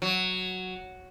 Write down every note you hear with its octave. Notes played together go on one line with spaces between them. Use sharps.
F#3